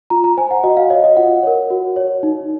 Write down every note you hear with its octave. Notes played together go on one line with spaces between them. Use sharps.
F4 A#5
A#5
C5 G#5
F#5
F#4 D#5
F5
C#5 D#5
D#5
F4 F#5
A#4 C#5
F#4
C#5
D#4